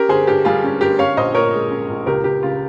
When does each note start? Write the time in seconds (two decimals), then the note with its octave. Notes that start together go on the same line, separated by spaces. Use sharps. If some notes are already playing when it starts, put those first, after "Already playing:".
Already playing: C#4 G4 A#4
0.09 G1 G#4 C5
0.27 G2 G4
0.45 G3 F4 G#4
0.64 C#4
0.81 G1 G4 A#4
0.99 C#4 C#5 F5
1.16 A#1 C5 D#5
1.34 A#2 A#4 C#5
1.54 G#3
1.71 C#4
1.89 A#1
2.06 C#2 G4 A#4
2.24 C#2 G4
2.43 C#3 F4